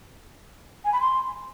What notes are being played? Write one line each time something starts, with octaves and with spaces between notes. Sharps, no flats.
G#5
B5
C6